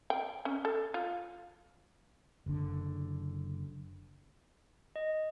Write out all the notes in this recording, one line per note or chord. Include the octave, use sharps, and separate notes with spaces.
G5
C#4
A4
F4
F#1 D3
D#5